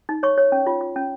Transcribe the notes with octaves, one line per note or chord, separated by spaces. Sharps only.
D#4
C#5 C#6
C#5
C#4
F4
F4
C#4